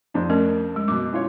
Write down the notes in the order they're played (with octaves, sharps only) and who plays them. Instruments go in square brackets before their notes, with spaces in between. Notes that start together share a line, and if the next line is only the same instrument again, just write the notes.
[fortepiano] F2 C4 D4
[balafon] A3 C#4 A#4
G#3
[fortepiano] F#2 B2 [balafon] D6
[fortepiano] C#4 F4 C#5